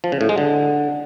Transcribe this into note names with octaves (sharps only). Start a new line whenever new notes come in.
F3
C#3
A2
G#3
D3